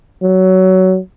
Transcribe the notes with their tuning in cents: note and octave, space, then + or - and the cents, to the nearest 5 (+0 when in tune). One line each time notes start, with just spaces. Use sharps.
F#3 +15